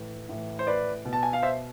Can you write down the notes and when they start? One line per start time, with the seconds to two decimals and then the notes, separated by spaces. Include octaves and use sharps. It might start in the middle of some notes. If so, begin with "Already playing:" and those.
Already playing: A2 E3
0.29 A2 E3
0.59 C5
0.67 B4 D5
1.05 B2
1.13 A5
1.23 G#5
1.33 F5
1.42 C5 E5